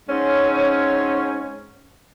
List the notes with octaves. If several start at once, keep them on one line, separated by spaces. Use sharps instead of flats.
G#2 C4 C#4